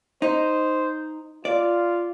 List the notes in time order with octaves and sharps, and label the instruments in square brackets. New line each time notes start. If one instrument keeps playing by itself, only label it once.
[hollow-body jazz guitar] D#4 [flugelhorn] C5
[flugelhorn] F4 [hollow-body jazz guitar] D5